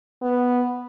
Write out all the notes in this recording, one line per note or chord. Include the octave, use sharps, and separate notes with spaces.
B3